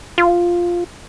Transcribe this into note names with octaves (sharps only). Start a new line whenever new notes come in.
F4